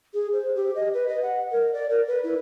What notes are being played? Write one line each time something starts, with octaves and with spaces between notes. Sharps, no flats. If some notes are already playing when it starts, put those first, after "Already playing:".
G#4
C5
G4
D#5
B4
D#5
F#5
A#4
D5
A#4
B4
E4